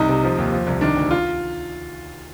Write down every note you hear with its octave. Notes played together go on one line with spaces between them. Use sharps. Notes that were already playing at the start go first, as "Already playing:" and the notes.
Already playing: C2 D#4
C3
F3
D#2
F3
C2
D#3 D4
D2
F4